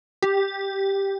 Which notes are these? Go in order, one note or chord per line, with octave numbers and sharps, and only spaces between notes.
G4